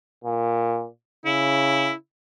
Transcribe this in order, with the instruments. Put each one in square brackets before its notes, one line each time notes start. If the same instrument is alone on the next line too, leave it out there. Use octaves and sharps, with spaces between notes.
[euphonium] A#2
[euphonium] C#3 [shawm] E4